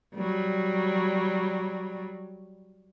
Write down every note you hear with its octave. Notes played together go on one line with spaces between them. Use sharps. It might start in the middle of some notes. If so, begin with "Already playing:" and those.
F#3 G3